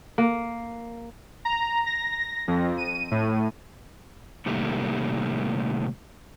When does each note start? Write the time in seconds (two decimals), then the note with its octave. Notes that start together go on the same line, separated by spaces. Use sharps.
0.18 A#3
1.45 A#5
1.86 A#6
2.48 F2
2.77 D#7
3.11 A2
4.46 A2 C3 D#3 G3 A3 A#3